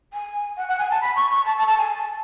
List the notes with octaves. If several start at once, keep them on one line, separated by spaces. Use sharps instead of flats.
G#5
F#5
F#5
G#5
A5
B5
C#6
C#6
A5
A5
A5
G#5